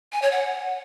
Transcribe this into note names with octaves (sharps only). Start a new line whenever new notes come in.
G#5
C#5
F#5